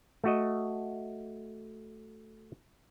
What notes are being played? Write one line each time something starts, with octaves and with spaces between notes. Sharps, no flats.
A3 F#4 D#5